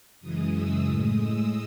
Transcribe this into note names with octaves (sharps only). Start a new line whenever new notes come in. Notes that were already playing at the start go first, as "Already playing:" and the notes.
F#2 C#3 E3 G#3 D#6
E6
A2 G#3 D#6
E6